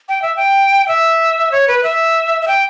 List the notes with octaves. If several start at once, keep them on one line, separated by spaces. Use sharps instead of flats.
G5
E5
G5
E5
C#5
B4
E5
E5
G5